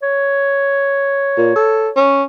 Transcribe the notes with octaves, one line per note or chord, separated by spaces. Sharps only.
C#5
A#2
A4
C#4